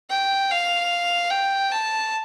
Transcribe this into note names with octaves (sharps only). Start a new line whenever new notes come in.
G5
F5
G5
A5